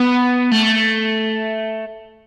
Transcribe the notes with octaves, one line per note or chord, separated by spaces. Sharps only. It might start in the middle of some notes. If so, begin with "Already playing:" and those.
Already playing: B3
A3